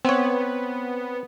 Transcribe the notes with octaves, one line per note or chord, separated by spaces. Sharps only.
B3 C4 C#5